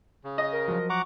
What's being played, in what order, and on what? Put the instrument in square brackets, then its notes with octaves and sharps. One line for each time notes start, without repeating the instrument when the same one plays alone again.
[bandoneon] C#3
[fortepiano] D#5
[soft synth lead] A#4
[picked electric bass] F3 F#3
[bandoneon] F#5 A#5 D6 [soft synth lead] C#6